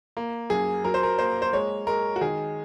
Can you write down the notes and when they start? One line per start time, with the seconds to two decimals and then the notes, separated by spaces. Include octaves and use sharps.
0.17 A#3
0.50 F#2 G#4
0.84 F#3 A#4
0.94 C5
1.03 A#4
1.19 A#3 C5
1.42 C5
1.53 G#3 C#5
1.87 G#3 A#4
2.16 F#4
2.21 D#3 G#4